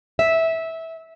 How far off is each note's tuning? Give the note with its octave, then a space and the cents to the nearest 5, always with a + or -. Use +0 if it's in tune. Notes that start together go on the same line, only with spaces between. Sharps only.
E5 -15